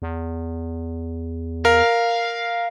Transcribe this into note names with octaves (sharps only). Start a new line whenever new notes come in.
E2
A#4 F5